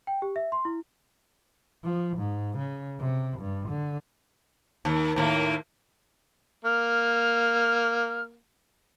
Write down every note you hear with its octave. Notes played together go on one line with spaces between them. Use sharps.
G5
G4
E5
C6
E4
F3
G#2
C#3
C3
G2
D3
D#2
D#2 A2 A#3
A#3 F6